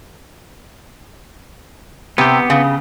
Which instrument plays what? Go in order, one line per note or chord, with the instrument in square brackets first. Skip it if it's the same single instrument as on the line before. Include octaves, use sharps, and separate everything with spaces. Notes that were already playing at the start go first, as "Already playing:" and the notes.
[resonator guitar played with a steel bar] C3 [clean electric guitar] B3 G4
[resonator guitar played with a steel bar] C#3